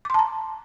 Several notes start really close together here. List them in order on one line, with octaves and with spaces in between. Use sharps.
D6 C6 A5 A#5